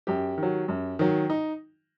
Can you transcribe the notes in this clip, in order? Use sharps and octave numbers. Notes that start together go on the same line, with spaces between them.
F#2 G4
D#3
F#3
F#2
D#3 F#3
D#4